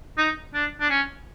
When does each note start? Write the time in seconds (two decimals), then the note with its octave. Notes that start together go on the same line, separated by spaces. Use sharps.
0.18 D#4
0.54 D4
0.81 D4
0.90 C#4